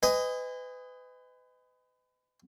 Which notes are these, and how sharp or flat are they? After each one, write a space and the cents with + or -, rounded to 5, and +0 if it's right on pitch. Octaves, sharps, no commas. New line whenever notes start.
B4 +35 D#5 +5 G#5 -25